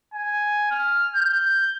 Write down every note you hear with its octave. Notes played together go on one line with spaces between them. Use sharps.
G#5
F6
G6